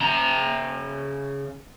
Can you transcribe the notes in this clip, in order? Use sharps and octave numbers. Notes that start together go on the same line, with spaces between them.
C#3 A#5